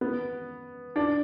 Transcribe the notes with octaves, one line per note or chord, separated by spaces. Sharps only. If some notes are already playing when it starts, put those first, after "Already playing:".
B3
D4